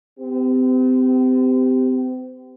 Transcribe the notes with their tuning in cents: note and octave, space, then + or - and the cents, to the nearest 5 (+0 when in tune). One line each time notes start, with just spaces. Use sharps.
C4 -40 G4 +0